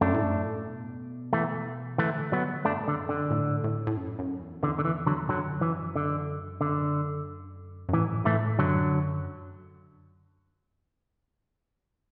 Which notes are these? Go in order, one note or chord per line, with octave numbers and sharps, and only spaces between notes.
F#2 A3 D4
A2
F#2
A2
B2
E3 A3
D3 E3 A3
F#3 B3
F#2 A3 D4
A2
F#2 D3
D3
A2
A2
A2
F#2
F#2
E2
E2 D3
D3
E3
D3 F#3
F#2 D3 F#3
E3
D3
D3
F#2
A2 E3
A2 E3 A3
F#2 D3 F#3